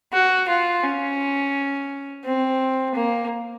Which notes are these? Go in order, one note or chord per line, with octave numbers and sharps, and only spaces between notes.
F#4
F4
C#4
C4
A#3